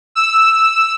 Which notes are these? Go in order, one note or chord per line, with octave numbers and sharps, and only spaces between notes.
E6